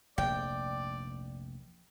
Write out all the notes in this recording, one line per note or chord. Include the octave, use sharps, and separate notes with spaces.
F1 A#1 D5 G5